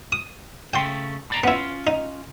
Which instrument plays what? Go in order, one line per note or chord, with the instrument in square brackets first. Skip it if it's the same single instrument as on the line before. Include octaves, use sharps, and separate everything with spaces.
[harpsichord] D#6
[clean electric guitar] C#3 A3 [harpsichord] G5 C6
[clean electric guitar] A2 D5 A#5
[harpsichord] B3 E4 [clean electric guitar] C#4 F4
[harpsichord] D#4